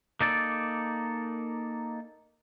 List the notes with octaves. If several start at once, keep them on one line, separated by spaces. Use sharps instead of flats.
A#3 D#4 A4 D5